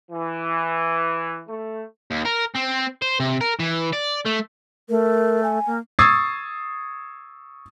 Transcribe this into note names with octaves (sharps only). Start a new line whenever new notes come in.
E3
A3
D#2
A#4
C4
C5
C3
A#4
E3
D5
A3
A3 A#4
G#5
A#3
C#6 D#6 E6 G#6 A6 C7